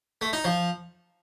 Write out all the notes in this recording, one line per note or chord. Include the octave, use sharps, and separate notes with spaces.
A3
D#4
F3